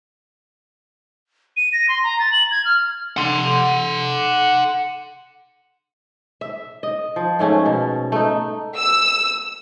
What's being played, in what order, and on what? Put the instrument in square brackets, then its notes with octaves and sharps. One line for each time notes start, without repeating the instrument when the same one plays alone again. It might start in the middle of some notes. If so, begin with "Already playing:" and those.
[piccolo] D#7
A#6
C6
A#5
A6
F#7
G#6
F6
[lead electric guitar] F#5 C6
[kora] E5
D#5
F3
G#2 A3 C#4
B2
A3 D#4
[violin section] E6